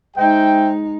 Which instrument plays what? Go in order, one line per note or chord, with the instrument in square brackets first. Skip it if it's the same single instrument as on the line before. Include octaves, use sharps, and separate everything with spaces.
[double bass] G#3 D#4 [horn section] C5 E5 G5